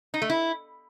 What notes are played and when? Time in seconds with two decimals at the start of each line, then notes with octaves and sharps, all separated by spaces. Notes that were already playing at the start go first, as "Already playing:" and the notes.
0.14 D#4
0.22 A3
0.30 E4